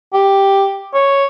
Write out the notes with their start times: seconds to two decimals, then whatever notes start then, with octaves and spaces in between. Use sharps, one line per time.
0.14 G4
0.94 C#5